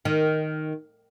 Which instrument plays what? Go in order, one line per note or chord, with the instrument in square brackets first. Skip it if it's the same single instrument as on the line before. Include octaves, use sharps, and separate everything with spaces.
[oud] D#3